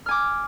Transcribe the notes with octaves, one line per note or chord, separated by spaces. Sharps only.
G#5 D6 F6